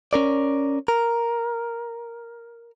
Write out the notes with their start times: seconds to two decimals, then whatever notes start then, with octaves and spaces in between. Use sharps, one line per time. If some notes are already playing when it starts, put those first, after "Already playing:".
0.13 C#4 A#4 D5
0.88 A#4